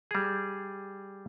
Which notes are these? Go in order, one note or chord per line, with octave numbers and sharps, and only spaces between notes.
G3 G#4